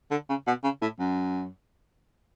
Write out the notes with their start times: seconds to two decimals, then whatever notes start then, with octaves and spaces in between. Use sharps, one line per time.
0.11 D3
0.30 C#3
0.47 B2
0.64 C#3
0.82 A2
1.00 F#2